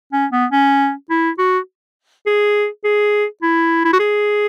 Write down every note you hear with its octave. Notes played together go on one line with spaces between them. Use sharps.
C#4
B3
C#4
E4
F#4
G#4
G#4
E4
E4
F#4
G#4